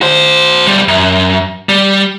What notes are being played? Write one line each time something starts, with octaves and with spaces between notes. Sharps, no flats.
F#4 C5
B1 G3
F#2
G3